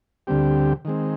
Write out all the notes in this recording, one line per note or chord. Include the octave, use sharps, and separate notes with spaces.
D2 D3 G3 C4 G4
D#3 G#3 C4